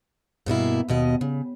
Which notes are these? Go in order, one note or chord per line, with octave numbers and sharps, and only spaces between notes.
G2 B2 A#3 E4
D#2 B2 D#5
C#3